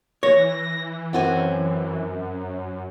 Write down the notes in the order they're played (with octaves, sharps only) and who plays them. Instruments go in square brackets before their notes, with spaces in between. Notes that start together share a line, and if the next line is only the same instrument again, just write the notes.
[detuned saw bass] E3 [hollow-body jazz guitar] C#5 [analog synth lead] A#6
[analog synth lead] F#2 [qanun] C4 F#4 G#5